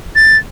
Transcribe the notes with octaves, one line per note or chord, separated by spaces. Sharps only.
A6